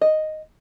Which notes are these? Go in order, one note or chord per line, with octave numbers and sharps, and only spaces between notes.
D#5